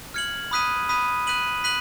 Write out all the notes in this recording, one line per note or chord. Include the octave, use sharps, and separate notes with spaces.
F6 G#6 C#7 F#7
B5 D#6 F#6 B6 D#7
B5 D#6 F#6 B6 D#7
F#6 B6 D#7 F#7
F#6 B6 D#7 F#7